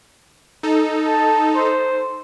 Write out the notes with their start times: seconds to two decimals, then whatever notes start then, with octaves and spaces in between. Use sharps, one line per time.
0.63 D#4 A4
1.01 A5
1.55 C5